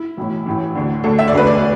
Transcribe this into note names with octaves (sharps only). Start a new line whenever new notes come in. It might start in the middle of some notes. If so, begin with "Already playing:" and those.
Already playing: E4
B1 A2 E3
A1 A2 E3
D2 D3
D2 D3 A4
E5
D5
E1 D2 D3 B4
D5